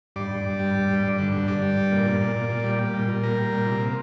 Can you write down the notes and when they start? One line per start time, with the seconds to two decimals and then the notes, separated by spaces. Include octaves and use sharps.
0.16 G2 D5
0.31 G2
0.45 G2
0.59 G3
0.75 G2
0.88 G2
1.03 G2
1.18 D3
1.33 G2
1.47 G2 D5
1.62 G3
1.77 G2
1.92 A#2
2.06 A#2
2.21 A#2
2.36 A#2
2.49 A#2
2.64 G3
2.79 G3
2.94 A#2
3.09 A#2
3.23 G3 A#4
3.37 G3
3.53 A#2
3.66 C3